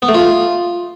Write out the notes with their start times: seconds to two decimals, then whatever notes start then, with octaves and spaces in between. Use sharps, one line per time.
0.02 B3
0.08 A3
0.14 F4